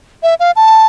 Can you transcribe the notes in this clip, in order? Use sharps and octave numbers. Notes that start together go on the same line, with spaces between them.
E5
F5
A5